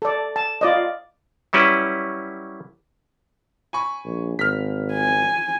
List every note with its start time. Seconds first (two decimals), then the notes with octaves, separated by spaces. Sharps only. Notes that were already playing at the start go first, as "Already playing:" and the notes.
0.02 A4 D5
0.36 A5
0.61 F4 D5 D#5
1.53 F#3 G3 C#4 E4 B4
3.73 G#5 B5 C#6
4.05 A#1
4.39 G#1 F6 B6
4.93 G#5